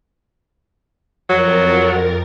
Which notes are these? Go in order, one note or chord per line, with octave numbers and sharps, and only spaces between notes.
F2 F#3 A#4 A6